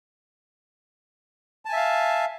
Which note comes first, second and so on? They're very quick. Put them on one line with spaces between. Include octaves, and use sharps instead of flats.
A5 G#5 E5 F5